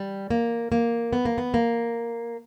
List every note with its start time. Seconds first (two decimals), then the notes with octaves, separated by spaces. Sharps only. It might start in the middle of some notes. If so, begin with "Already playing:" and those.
Already playing: G3
0.30 A#3
0.72 A#3
1.13 B3
1.25 A#3
1.38 B3
1.54 A#3